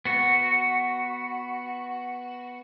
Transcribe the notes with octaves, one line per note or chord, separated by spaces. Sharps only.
B3 F#4